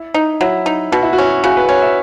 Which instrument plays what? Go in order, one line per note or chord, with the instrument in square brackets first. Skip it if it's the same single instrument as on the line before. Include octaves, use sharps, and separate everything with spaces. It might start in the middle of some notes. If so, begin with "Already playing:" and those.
Already playing: [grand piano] E4
[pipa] D#4
[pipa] F#3 [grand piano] E4
[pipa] D#4
[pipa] B2 [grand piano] F#4
[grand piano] E4
F#4
[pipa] C#4
[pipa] C#3 [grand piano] F#4
[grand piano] B4
[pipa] C#4 [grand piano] C#5
[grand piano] E5